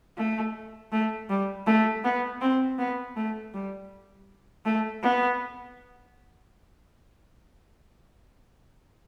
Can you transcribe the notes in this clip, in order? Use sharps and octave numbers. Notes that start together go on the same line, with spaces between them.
A3
A3
G3
A3
B3
C4
B3
A3
G3
A3
B3